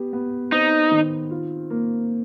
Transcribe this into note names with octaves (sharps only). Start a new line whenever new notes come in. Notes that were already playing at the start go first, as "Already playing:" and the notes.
Already playing: B3 G4
B3
C4 D#4
D#3
F4
A#3